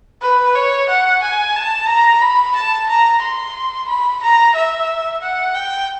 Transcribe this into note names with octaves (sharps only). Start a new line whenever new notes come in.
B4
C#5
F#5
G#5
A5
A#5
B5
A5
A#5
C6
B5
A#5
E5
F#5
G5